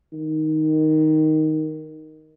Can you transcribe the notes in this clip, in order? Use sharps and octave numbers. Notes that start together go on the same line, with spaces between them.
D#3